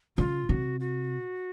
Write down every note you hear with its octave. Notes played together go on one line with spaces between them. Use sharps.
C#3 F4
C3 F#4
F#4